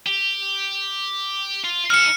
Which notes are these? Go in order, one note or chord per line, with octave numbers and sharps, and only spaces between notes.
G4
F4
D#4 A4 F6 C#7